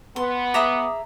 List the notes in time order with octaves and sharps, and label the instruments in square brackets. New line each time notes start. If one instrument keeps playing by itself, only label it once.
[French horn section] B3 [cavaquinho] C6
[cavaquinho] G#4 E5 A#5 [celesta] D6 D#6